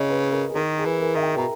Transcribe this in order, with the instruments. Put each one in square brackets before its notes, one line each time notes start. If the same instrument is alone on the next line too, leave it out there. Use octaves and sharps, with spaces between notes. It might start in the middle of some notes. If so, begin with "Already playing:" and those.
Already playing: [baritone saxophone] C#3 [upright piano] C#5 D#5
[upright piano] B4
A#4
G#4
[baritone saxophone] D#3 [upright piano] A#4
[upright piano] G#4
[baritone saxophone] E3
[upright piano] A#4
[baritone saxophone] D#3 [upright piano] E5
[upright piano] G5
[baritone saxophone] B2 [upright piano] A#5